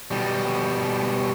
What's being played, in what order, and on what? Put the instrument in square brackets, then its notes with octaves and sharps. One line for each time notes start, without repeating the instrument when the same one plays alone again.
[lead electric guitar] B2 G3